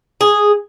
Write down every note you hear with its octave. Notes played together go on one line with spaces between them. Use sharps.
G#4